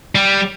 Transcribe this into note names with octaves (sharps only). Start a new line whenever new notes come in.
G3